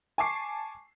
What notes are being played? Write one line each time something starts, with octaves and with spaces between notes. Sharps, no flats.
G#5 A5 C#6 D6 C7